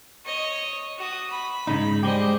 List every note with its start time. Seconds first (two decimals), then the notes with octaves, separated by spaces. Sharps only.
0.25 C#5 D#5
0.98 F#4 D#6
1.30 B5
1.67 G#2 C#3 D#4
2.03 G3 G#3 G4 C5 D#5